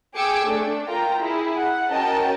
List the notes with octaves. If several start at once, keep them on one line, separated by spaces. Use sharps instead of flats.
G#4 G5 D6 E6 G#6 C#7
A3 D4
F4 A#4 G5 A#5
E4 G#4
F#5
C#4 F#4 A#4 D#5 G5 A5